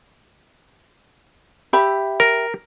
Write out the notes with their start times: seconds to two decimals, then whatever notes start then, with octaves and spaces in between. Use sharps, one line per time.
1.73 G4 E5 B5
2.20 A#4